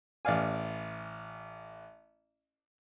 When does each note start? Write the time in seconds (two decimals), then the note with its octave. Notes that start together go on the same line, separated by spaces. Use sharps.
0.25 A1 D5 F5 G#5